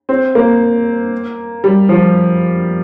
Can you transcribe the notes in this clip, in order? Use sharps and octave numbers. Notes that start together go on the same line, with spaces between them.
C4
A#3
G3
F3